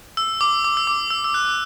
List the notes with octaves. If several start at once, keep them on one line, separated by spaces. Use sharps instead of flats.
E6
D6
D6
E6
D6
E6
E6
F#6